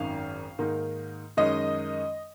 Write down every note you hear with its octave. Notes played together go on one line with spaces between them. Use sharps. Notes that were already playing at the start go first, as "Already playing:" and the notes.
Already playing: G#1 F#2 D#3 F5
G#2 D#3 A#3
F#2 D#3 G#3 C#4 D#5